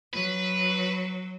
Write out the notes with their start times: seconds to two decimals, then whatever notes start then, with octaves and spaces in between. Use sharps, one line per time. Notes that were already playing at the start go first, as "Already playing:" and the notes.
0.13 F#3 B4